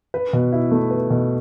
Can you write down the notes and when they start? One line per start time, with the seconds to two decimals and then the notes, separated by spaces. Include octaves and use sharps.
0.14 B4
0.33 B2
0.52 E4
0.71 A3
0.91 B4
1.10 B2